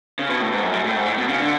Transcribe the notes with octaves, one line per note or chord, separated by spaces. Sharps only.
C#3
B2
A2
G#2
F#2
G#2
A2
G#2
A2
B2
C#3
D3